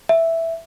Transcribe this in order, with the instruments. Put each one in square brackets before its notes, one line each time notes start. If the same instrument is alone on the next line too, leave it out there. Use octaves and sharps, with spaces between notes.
[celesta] E5